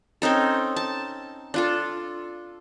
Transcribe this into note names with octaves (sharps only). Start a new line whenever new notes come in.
C4 C#4 D#4 A4
A5
D4 F4 A4